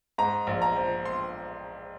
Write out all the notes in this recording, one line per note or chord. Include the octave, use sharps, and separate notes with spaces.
G#2 A#5
A#1
A#5
F3
C6